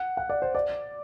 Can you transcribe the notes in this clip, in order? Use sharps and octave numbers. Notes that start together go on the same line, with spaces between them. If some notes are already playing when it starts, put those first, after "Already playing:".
Already playing: F#5
F#5
D5
C5
D5